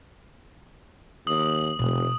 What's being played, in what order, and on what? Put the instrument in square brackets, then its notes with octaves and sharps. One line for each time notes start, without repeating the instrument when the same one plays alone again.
[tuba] D#2 [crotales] D#6 F#7
[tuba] F1 [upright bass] B2 A3